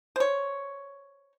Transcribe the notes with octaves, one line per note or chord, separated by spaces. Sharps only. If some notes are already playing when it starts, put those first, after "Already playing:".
C5 C#5